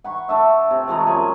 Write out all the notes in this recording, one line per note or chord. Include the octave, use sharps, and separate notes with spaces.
F#5 B5 C#6
A3 D4 E5
C3
F3 G#3 A3 A#5
F#2 G#4 G#5